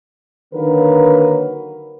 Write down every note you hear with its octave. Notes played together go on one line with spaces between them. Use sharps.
D3 D#3 F#3 A#3 A#4 B4